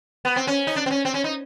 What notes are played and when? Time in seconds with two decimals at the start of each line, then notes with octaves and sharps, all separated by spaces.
0.25 B3
0.36 C4
0.47 C#4
0.67 D#4
0.76 D4
0.86 C4
0.91 C#4
1.05 C4
1.14 C#4
1.24 D#4